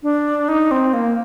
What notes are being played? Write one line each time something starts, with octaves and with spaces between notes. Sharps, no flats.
D4
D#4
C4
A#3